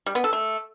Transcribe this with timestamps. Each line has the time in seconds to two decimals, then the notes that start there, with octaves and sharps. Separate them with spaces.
0.06 G3
0.15 B3
0.24 A4
0.33 A3